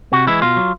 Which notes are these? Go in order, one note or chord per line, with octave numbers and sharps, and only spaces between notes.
C3 F#4
E3 G#3 E4
B2 F4
F#3